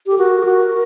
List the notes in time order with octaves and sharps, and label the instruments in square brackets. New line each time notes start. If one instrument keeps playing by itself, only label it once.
[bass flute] G4 [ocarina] A4
[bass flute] F#4 [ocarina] A#4
[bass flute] G4
F#4